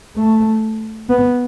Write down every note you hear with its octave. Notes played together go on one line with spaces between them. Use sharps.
A3
B3